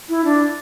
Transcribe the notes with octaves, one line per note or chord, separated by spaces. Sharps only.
E4
D4